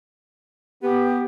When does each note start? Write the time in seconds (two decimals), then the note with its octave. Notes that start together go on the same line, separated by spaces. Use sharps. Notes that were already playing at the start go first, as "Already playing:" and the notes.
0.82 B3 G4